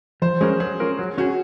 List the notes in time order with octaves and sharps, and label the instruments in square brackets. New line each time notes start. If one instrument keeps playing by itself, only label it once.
[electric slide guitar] F3 [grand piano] C5
[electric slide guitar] G#3 C#4 F#4 A#4 [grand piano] G#4
[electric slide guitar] F#3 [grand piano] G#4
[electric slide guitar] C#4 F4 A#4
F#3
[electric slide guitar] C#4 G#4 [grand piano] F#4